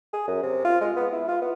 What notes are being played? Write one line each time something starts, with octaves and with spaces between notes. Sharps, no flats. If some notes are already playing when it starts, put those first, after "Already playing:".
G#4
F#2
C3
F4
G#3
B3
E4
F4
B3